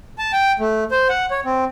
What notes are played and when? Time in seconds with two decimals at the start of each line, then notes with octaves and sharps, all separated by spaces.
0.18 A5
0.33 G5
0.59 A3
0.91 C5
1.10 F#5
1.31 C#5
1.45 C4